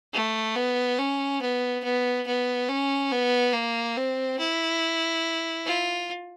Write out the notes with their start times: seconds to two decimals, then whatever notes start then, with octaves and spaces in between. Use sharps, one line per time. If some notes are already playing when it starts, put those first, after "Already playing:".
0.13 A3
0.56 B3
0.99 C#4
1.42 B3
1.84 B3
2.27 B3
2.69 C#4
3.12 B3
3.53 A#3
3.97 C4
4.39 E4
5.66 F4